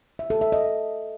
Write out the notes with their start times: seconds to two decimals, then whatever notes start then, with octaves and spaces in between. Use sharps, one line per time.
0.19 E5
0.30 A4
0.41 E5
0.52 D#5